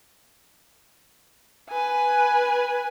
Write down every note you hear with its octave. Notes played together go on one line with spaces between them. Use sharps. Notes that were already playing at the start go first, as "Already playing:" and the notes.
B4 G#5